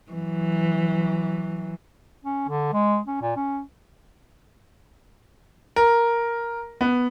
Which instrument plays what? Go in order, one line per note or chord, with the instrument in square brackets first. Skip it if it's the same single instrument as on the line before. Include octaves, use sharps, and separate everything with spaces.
[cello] E3 F#3
[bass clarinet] C#4
D3
G#3
C#4
A#2
C#4
[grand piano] A#4
B3